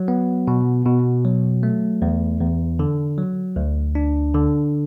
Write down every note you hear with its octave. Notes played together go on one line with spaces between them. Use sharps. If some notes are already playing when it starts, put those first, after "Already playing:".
Already playing: F#3
B3
B2
B2
F#3
A3
E2
E2
D3
F#3
D2
D4
D3